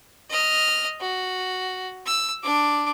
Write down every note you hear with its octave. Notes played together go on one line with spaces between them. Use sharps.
D#5 F6
F#4
E6
D4 D6